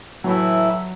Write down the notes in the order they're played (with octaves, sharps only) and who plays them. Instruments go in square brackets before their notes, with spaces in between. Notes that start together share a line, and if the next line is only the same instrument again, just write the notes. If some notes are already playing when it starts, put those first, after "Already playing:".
[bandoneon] A2 E3 A3 E4 [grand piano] F#3